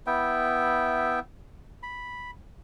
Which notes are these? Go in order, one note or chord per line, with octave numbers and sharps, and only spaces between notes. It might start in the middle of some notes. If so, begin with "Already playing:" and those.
B3 E4 E5 G5
B5